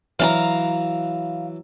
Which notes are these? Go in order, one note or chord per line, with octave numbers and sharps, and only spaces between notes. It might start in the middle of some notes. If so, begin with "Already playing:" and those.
E3 F#3 E4 F5 A5 A#5